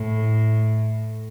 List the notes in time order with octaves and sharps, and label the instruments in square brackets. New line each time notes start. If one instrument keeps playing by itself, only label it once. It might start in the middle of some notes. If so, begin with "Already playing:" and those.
Already playing: [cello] A2